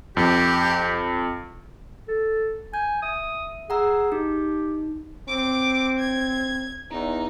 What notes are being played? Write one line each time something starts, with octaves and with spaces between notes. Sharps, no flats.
F2 G4
A4
G#5 G6
E5 D#6
G#4 F#5 A#5 E6
D#4 G4
C4 D6
G#6
E2 D#4